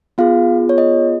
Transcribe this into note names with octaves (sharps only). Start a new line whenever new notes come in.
B3 F4 G#4 F5
C#5
D#5